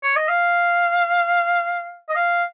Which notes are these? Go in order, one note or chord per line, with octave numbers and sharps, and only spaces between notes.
C#5
D#5
F5
D#5
F5